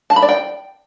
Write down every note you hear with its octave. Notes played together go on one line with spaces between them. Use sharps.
A5
B5
D5
G5